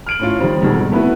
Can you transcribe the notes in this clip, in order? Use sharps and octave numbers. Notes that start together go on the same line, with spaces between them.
F6 D7 F#7
A2 C#4 F4
D#3 F3 G3 C4
F2 B2 D#3 G3 G#3
B1
A3 B3 E4 F#4 B4